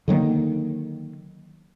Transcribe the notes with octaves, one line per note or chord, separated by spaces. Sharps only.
D3 D#3 F#3 A#3